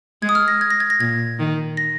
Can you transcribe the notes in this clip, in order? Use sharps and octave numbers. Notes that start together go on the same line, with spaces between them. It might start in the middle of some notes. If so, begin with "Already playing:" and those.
G#3 G#6
D#6
F6
A#6
G#6
A#6
G#6
A#6
A#2 G#6
D#3
A#6